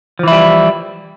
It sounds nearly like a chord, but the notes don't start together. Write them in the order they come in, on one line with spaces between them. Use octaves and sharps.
F3 E3 E4 G3